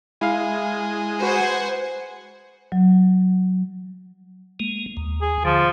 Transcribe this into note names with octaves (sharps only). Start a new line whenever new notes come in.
G#3 E4 F5
F#4 B4 C5 F#5 G#5
F#3
G#3 A#3
D#2
G#4
D3 F3